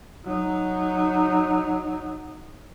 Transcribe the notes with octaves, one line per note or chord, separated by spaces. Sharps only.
F#3 D#4